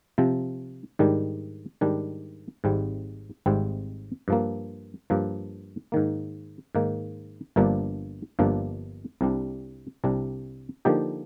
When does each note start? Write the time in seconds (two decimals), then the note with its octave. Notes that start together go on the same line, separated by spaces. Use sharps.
0.18 C3 F3 C4
0.99 G#2 D#3 G3 D4
1.81 G#2 D#3 G3 D4
2.64 G#1 G#2 G3 C4
3.46 G#1 G#2 G3 C4
4.28 G2 F3 A#3
5.10 G2 F3 A#3
5.92 G#2 D#3 A#3
6.75 G#2 D#3 A#3
7.56 G1 G2 F3 A#3 D4
8.39 G1 G2 F3 A#3 D4
9.21 C2 C3 G3 D4
10.04 C2 C3 G3 D4
10.85 D3 F3 A#3 D#4 G4